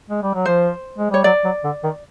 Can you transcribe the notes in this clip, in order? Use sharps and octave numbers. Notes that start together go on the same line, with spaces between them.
G#3
G3
F#3
F3 C5
G#3
G3 C#5
F#3 D5
F#3
D3
D#3